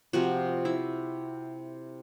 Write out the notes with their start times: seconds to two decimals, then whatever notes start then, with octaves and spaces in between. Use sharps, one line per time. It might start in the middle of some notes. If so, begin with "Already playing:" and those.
0.13 C3 F3 F#4
0.65 E4